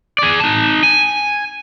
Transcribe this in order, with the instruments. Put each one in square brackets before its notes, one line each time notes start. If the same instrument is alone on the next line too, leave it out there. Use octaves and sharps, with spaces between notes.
[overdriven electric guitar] G#4 D5
D#4 A5
G#5